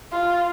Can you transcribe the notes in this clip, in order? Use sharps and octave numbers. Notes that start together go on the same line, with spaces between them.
F4